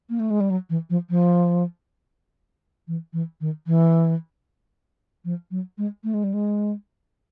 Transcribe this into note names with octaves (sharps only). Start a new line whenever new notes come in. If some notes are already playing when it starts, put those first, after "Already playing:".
A#3
A3
G#3
G3
F#3
E3
F3
F3
E3
E3
D#3
E3
F3
F#3
G#3
A3
G#3
G3
G#3